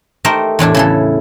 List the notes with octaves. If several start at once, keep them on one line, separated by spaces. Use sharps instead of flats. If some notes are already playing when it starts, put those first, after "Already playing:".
A3 D#4 G4 A#4 C5
E2 A2 D4 E4
C#3 E3 A4